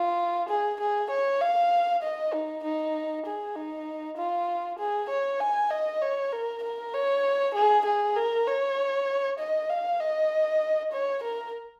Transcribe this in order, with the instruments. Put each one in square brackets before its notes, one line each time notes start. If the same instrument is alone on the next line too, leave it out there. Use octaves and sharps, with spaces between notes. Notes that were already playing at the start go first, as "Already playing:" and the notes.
Already playing: [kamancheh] F4
G#4
G#4
C#5
F5
D#5
D#4
D#4
G#4
D#4
F4
G#4
C#5
G#5
D#5
C#5
A#4
A#4
C#5
G#4
G#4
A#4
C#5
D#5
F5
D#5
C#5
A#4